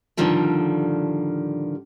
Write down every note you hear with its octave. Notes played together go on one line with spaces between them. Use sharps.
A2 D3 D#3 F3 G3